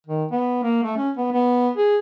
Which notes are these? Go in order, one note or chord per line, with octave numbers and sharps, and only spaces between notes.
D#3
B3
A#3
A3
C#4
B3
B3
G#4